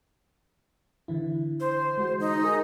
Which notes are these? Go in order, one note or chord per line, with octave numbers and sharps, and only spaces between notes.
D3 E3 E4
C5
G#3 F#4
D#4
G#4 A#4 G#5